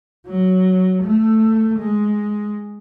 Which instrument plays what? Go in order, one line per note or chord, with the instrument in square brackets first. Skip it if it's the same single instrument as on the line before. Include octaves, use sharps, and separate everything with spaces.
[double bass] F#3
A3
G#3